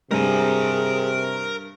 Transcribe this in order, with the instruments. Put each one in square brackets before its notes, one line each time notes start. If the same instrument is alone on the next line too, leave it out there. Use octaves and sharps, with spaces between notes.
[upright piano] G2 [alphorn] C3 [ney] G#4 [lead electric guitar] A#4 G#5